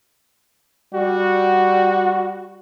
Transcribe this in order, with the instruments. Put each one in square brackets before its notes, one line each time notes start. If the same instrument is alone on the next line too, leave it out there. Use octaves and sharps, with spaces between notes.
[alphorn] G3 [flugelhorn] F#4